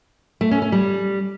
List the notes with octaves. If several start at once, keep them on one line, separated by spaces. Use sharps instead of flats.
A3
C#4
C#4
G3